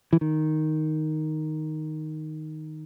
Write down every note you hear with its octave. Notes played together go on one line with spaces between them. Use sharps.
E3
D#3